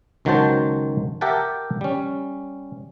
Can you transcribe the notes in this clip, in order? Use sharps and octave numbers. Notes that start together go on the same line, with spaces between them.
C#2 D#3 F#3 F#4 C5 A5
G4 A#4 E5 F#5 G5 A5
G3 C#4